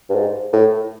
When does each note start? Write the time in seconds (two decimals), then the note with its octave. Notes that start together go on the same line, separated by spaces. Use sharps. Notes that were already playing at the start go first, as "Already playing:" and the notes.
0.10 G2
0.15 G#2
0.53 A2